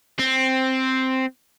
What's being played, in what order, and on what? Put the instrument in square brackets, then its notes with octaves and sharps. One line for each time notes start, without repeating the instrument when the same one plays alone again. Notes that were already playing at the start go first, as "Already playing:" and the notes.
[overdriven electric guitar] C4